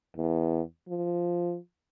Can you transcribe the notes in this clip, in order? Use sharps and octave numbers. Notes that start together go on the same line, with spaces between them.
E2
F3